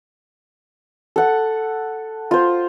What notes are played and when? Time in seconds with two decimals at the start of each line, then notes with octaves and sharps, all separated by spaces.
1.16 A4 F#5 C#6
2.31 F4 C5